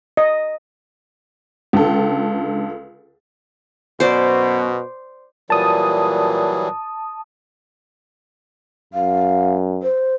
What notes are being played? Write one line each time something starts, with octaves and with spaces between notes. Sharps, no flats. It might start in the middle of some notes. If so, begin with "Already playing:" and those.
D#5
C#2 D3 A4
F#2 B2 C5 D5
A#2 E3 F#3 G3 A5 D#6
F#2 F5
C5